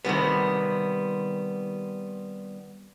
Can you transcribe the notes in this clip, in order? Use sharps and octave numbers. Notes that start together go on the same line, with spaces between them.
C3 D#3 G3 B3